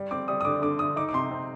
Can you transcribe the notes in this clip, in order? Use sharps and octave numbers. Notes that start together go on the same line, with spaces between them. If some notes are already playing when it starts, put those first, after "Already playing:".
Already playing: G3
C4 D6
G3 D#6
D#6
D3 D6
D3 D6
D3 D#6
D#4 D6
D6
C3 C6
C4